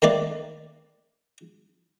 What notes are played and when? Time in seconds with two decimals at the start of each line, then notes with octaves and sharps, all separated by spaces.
0.02 D#3 A3 A#3 B4 D5